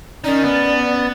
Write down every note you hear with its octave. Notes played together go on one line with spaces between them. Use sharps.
D#3 C#4 D#4 D5
B3